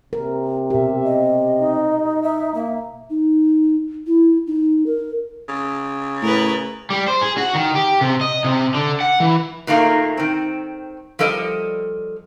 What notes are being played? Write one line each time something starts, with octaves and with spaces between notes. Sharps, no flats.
C3 A#4
B2 G4 A#4 E5
D#5
D#4
E5
A#3 E5
D#4
E4
D#4
A#4
C#3
A2 A#4 B4
G3
C5
G#4
F#4
D#3
G4
C3
D#5
C3
D3
F#5
E3
A#2 D#3 A3 A#3
D#3 C4
F3 G3 A4 A#4 D#5